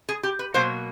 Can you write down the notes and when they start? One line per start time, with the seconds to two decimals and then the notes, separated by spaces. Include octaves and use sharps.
0.09 G#4
0.23 G4
0.39 B4
0.54 B2 F#3 A#3 C5